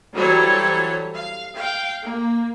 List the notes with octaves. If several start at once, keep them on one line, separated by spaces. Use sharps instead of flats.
E3 F#3 G3 A4 C5 C#5
F5
F5 G5
A#3